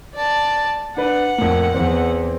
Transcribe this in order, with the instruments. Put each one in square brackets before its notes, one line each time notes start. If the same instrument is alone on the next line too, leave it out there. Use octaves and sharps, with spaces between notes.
[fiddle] D5 A5
[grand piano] D4 B4 D5 [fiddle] F#5
[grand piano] F2 A2 A#3
[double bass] E2 [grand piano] C4